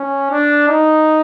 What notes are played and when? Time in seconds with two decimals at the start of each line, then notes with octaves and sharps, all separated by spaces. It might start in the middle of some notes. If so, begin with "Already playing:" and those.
Already playing: C#4
0.30 D4
0.68 D#4